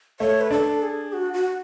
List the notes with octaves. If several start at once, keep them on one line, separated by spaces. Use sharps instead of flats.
A3 C#5
B4
D4 A4
G#4
F#4
F#4